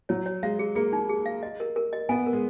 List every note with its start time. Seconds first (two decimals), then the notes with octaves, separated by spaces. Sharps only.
0.09 F#3 C#5
0.26 C#5
0.43 G#3 F5
0.59 G#4
0.75 A#3 G#4
0.93 D#4
1.09 G#4
1.26 F5
1.43 D#5
1.60 A#4
1.76 A#4
1.93 D#5
2.09 B3 G#5
2.26 A#4
2.33 G#3